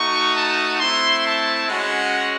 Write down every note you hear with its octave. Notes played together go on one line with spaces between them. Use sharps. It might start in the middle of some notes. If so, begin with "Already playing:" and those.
Already playing: A3 D#4 F#4 C#6
A5
A3 C4 E4 C6
A5
G#3 C#4 F#4 F#5